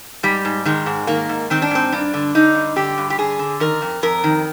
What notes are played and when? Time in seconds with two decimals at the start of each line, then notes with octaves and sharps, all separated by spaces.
0.23 G#2 G3
0.45 G#2
0.65 D#3 G#3
0.86 G#2
1.07 D#3 A#3
1.29 G#2
1.50 D#3 C4
1.62 D4
1.71 G#2 C4
1.92 G2 D4
2.14 D3
2.35 D3 D#4
2.55 G2
2.76 D3 G4
2.98 G2
3.10 G4
3.18 D3 G#4
3.39 D3
3.60 D#3 A#4
3.82 F2
4.03 F2 A#4
4.24 D#3